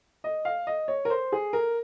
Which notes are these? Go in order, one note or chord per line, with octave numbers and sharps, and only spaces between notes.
D#5
F5
D#5
C#5
A#4
C5
G#4
A#4